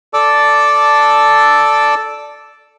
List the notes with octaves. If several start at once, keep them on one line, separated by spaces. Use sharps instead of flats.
A4 D5 A5 D6 E6